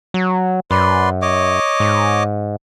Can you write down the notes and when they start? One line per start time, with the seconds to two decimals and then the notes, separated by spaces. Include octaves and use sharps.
0.14 F#3
0.71 F#2 B4 D5 C6
1.22 C#5 D#5 D6
1.80 G#2